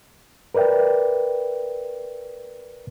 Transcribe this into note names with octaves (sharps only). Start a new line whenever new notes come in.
A#4 B4 D5 E5 G5